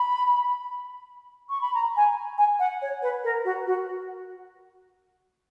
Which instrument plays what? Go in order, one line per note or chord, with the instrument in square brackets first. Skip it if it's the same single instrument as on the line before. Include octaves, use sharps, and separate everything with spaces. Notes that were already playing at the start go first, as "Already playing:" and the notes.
Already playing: [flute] B5
C#6
B5
A#5
G#5
G#5
F#5
C#5
B4
A#4
F#4
F#4